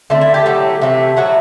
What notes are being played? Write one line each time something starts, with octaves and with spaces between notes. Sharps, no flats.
D3 A3 C4
E4
G4
A2 F#3 A3
C3 E3 A3
A2 F#3 A3 F#4